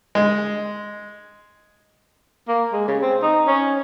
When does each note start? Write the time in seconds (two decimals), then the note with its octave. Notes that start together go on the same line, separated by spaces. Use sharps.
0.15 G#3
2.48 A#3
2.73 G#3
2.88 C#3
3.02 C4
3.23 D#4
3.48 C#4